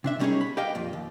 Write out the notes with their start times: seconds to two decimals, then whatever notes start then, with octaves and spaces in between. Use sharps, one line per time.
0.04 C3 D4 E5
0.19 B2 G3 C#4 D#4 G#4 C#5
0.41 B5
0.57 G4 B4 D#5 F5 G5
0.75 F2 A#2
0.93 D#2